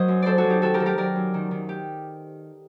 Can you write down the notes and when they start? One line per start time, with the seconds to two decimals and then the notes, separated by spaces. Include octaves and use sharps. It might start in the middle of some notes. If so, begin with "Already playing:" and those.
Already playing: F#3 A#4 C5 D#5
0.08 F#2
0.22 F#2 A4 C5 D5
0.38 F#4 A4
0.44 F#3
0.50 D#4 G4
0.62 D#3 F#4 A4
0.74 G4 A#4
0.80 D#3 A4
0.86 G4 A#4
0.98 F#3 A#4 D5
1.16 F#2
1.34 D#3
1.51 D#3
1.69 G4